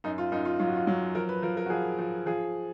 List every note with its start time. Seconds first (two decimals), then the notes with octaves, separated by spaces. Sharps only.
0.04 F#2 D#4
0.18 F4
0.32 F#2 D#4
0.45 F4
0.59 F#3 F4
0.67 F#4
0.76 F4
0.87 F#3
1.15 F3 A#4
1.29 B4
1.42 F3 A#4
1.57 A#4
1.66 F#4
1.70 F3 G#4
1.99 F3
2.26 F3 G#4